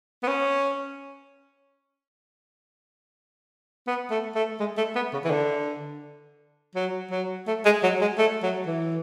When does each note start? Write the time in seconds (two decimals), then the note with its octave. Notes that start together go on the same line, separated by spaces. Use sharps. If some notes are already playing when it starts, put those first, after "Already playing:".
0.23 B3
0.28 C#4
3.87 B3
4.11 A3
4.35 A3
4.60 G#3
4.77 A3
4.95 B3
5.13 C#3
5.24 E3
5.31 D3
6.75 F#3
7.11 F#3
7.47 A3
7.65 G#3
7.83 F#3
8.01 G#3
8.18 A3
8.43 F#3
8.67 E3